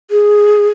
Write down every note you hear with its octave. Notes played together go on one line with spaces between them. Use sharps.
G#4